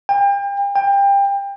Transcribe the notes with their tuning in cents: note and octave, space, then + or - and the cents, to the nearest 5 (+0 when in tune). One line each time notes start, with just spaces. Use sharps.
G5 +35
G5 +25